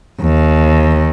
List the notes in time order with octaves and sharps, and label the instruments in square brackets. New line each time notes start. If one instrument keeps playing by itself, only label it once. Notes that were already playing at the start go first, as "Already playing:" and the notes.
[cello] D#2